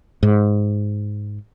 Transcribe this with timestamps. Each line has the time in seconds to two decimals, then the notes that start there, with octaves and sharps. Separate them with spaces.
0.23 G#2